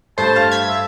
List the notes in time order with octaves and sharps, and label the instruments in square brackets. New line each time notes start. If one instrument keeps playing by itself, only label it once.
[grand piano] G2 A3 [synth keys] C5 [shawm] A5
[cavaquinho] F5
[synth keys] G#6 B6
[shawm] E5